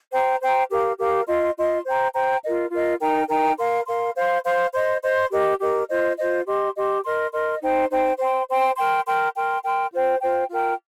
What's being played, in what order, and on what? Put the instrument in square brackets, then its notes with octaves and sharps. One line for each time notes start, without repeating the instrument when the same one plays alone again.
[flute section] C5 G5 A#5
C5 G5 A#5
G4 A#4 F5
G4 A#4 F5
F4 D#5 C6
F4 D#5 C6
C5 G5 A#5
C5 G5 A#5
F4 A#4 D#5
F4 A#4 D#5
D#4 A#4 G5 A#5
D#4 A#4 G5 A#5
A#4 F5 C6
A#4 F5 C6
C5 F5 C6
C5 F5 C6
C5 D#5 C6
C5 D#5 C6
G4 A#4 D#5
G4 A#4 D#5
F4 C5 D#5
F4 C5 D#5
G4 D#5 C6
G4 D#5 C6
A#4 D#5 C6
A#4 D#5 C6
D#4 C5 G5
D#4 C5 G5
C5 G5 C6
C5 G5 C6
A#4 G5 C6
A#4 G5 C6
A#4 G5 C6
A#4 G5 C6
F4 C5 G5
F4 C5 G5
F4 A#4 G5